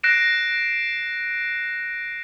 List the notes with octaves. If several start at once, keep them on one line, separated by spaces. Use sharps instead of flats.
F#6 A#6 C7 D7 E7